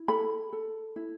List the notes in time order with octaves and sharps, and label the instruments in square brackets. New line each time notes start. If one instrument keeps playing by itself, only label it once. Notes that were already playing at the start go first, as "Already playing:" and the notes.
Already playing: [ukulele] E4
A4 B5
A4
E4